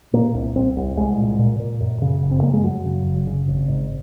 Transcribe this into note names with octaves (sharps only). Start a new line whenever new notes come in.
A#2 A#3
C2
C2 C4
C2
C2 G#3
A#2
A#2
A#2
F#2
C#3
F#1
C4
F#2 A#3
G#3
F#2 F#3
C#3
F#1
C#3
G#1
G#2